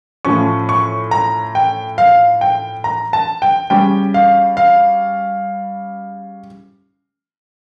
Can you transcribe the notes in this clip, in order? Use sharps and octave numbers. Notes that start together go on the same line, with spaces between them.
A2 F3 C#4 C#6
C#6
A#5
G5
F5
G5
A#5
A5
G5
C#3 G3 C#4 G5
F5
F5